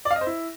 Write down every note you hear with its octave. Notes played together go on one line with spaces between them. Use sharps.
D5
F5
D#5
C5
E4